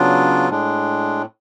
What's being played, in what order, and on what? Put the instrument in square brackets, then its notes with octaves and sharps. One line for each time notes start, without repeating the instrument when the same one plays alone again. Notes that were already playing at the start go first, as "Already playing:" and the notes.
Already playing: [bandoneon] C#3 F#3 B3 D4 F4
A2 G#3 D4